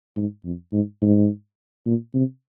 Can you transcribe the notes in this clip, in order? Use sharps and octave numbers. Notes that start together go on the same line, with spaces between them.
G#2
F2
G#2
G#2
A#2
C3